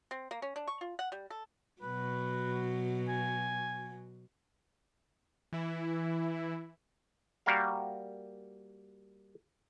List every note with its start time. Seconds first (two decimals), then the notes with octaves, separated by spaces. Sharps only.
0.11 C4
0.31 A#3
0.42 C#4
0.56 D4
0.68 C#6
0.81 F4
0.99 F#5
1.12 G3
1.30 A4
1.82 B2 F#3 B4
3.08 G#5
5.53 E3 E4
7.46 G3 A#3 F#4 A#4 F5